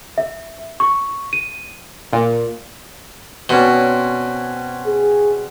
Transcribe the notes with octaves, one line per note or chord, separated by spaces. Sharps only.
E5
C#6
D#7
A#2
B2 C4 C#4 D5
G#4